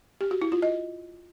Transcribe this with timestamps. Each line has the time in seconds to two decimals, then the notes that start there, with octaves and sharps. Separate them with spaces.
0.21 G4
0.31 F#4
0.42 E4
0.52 F4
0.62 D#5